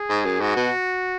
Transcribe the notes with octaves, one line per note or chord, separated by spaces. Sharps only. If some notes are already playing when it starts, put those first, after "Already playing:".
Already playing: G#4
G#2
F#2
G#2 F#4
B2